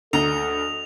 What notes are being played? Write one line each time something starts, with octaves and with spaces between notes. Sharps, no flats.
D2 A4 D#5 A#5 F7